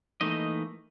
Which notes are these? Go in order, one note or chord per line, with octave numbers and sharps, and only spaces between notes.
E3 A3 A#3 D#4 D#5